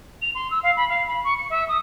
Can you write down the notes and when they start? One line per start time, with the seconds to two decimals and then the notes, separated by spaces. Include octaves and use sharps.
0.21 F7
0.35 C6
0.50 E6
0.63 F5
0.76 B5
0.89 F5
1.07 B5
1.24 C#6
1.38 C#7
1.50 E5
1.68 D#6